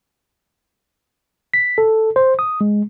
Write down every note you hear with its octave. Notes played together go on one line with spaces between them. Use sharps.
B6
A4
C5
D#6
G#3